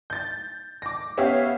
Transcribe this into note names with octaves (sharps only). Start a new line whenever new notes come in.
G6 A6
D6 A#6
B3 C#4 G4 C#5 E5 F5